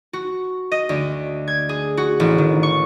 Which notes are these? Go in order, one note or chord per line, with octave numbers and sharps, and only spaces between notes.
F#4
D#5
D2
G#6
G#4
F#4
A1
D#3
C#6